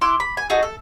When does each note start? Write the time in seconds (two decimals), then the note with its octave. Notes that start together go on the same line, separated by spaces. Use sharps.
0.01 E4 C6 D6 F#6
0.20 B5
0.37 G#5
0.50 D#4 F#4 G#4 A4
0.63 A4